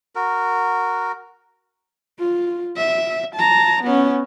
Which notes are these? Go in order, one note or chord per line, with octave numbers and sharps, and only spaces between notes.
F#4 A#4
F4
E5
A5 A#5
B3 C#4